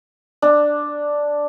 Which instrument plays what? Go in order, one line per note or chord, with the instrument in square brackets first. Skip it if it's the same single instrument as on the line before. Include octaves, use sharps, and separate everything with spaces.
[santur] D4